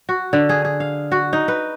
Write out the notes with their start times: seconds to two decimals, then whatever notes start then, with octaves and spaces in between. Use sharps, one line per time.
0.09 F#4
0.33 D3
0.49 G#4
0.65 G#4
0.80 F5
1.12 F#4
1.33 D#4
1.48 B4